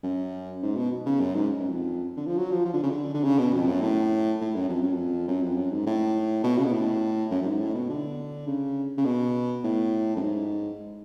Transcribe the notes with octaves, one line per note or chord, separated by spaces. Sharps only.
F#2
G#2
B2
C#3
F#2
G#2
F#2
F2
D3
F3
F#3
F3
F3
D3
C#3
D3
D3
C#3
B2
F2
F#2
A2
A2
F#2
F2
F#2
F2
F#2
F2
F#2
G#2
A2
B2
C#3
B2
A2
F#2
F#2
G#2
A2
B2
D3
C#3
C#3
B2
A2
F#2
G#2